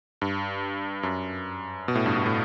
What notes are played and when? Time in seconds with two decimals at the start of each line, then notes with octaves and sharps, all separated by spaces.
0.22 G2
1.03 F#2
1.88 B2
1.95 A2
2.06 G2
2.16 G2
2.26 A2